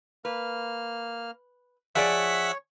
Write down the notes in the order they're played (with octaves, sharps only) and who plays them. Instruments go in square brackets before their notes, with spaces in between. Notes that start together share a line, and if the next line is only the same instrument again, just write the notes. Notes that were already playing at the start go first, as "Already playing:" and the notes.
[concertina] A#3 F6 [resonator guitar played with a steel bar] B4
[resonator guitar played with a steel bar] F3 G#4 D5 [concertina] C#5 [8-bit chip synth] E5 F#5 B6